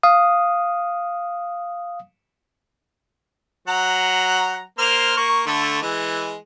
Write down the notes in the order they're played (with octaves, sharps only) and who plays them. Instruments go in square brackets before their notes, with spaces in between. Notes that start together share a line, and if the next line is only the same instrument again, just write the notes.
[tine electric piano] F5 D#6
[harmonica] F#3 F#5 A#5
A#3 C5 F6
A#3 C#6
D3 A3
E3 G#3